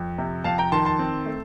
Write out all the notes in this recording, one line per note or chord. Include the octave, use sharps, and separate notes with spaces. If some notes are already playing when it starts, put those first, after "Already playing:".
Already playing: F2
C3
F2 F5 A5
G5 A#5
D#3 A5 C6
A5 C6
C4
A3